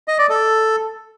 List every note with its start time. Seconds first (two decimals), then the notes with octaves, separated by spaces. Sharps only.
0.08 D#5
0.19 D5
0.29 A4